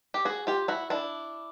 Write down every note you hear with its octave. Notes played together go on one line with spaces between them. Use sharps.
G4
F#4 G#4
F4 G4
E4 F#4
D4 E4